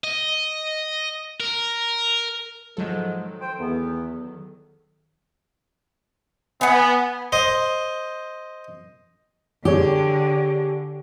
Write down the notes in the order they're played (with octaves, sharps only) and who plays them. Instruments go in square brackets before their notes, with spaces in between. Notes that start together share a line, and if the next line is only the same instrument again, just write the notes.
[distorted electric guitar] D#5
A#4
[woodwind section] G#2 F3 G#3 [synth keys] D#3 F#3 A4
[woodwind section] C5 G5
E2 B3
[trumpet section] B3 [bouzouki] F#5 G#5
[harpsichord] C5 D#5
[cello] D3 [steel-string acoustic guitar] G4 [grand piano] G#4 C#5